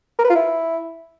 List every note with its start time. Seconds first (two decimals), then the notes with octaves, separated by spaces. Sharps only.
0.19 A#4
0.24 B4
0.30 F4
0.35 E4